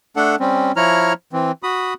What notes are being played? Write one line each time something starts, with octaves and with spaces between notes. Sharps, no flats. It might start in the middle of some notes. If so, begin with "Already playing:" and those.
A3 D4 A4 F#5
G3 C4 C#4
F3 E4 C#5 A#5 F6
E3 C4
F#4 B5 D#6